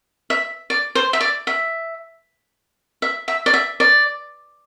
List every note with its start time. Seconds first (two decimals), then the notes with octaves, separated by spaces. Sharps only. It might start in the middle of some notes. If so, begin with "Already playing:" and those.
0.30 E5
0.70 D5
0.95 C5
1.13 E5
1.21 D5
1.47 E5
3.02 E5
3.28 E5
3.46 D5
3.54 E5
3.80 D5